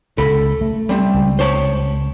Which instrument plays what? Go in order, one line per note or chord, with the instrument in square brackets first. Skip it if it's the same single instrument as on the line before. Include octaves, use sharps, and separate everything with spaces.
[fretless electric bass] C#2 [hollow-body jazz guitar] A4 B5
[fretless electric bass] A3
[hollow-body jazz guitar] G3 C4
[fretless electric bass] C#2
[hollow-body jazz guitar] C5 C#5 A5